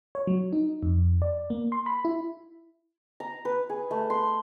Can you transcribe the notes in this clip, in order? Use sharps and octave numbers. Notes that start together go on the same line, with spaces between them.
C#5
F#3
D#4
F2
D5
A#3
C6
B5
E4
A#5
B4
G#4
A3
C6